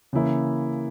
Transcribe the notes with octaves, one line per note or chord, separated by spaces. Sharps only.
C#3 E3 A#3 E4